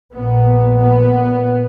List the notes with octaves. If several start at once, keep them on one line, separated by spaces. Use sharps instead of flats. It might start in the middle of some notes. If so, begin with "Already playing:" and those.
A#1 A#2 B3
B3